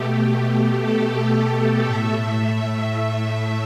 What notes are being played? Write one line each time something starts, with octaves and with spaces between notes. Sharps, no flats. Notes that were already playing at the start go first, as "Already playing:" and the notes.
Already playing: B2 A3 G4
A4
A2 A3 E5
E5